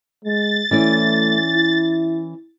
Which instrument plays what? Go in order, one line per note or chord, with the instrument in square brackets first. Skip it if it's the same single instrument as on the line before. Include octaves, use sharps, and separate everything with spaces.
[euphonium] G#3 [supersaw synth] A6
[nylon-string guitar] E3 C#4 D5 [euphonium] A3
[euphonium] E4